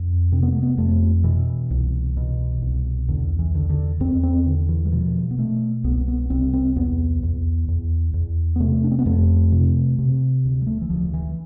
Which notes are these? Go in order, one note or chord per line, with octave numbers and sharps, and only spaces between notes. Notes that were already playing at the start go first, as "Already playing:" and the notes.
Already playing: F2
C3 C4
B3
A3
B3
F2 A3
B2 E3
C2
B2
C2
E2 D3
E3
D3
D3
E2 C4
C4
D3
E3
G3
B2 F3
B3
B2 A3
C2 B3
B3
C2 C4
C4
E2 B3
E2
E2
E2
B3
C3 A3
D4
C4
B3
F2 A3
C3
C3
D2
G3
A3
E3
D2 F3
E3